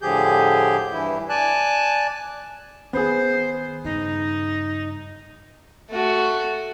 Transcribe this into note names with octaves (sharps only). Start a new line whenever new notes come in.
A2 D3 F3 G4 G#4 G6
G2 E3 E4
D5 G#5 A5 F#6
D#3 B3 G#4 C5
G2 C#3 D#4
A3 F#4